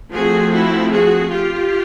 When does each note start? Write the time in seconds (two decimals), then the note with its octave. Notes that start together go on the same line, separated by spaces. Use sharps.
0.13 F3 A3 C4 F#4 G#4
0.52 E4 F#4
0.92 F#4 G#4
1.31 F4 G4